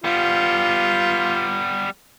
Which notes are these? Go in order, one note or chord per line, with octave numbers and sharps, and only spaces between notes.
G3 B3 F4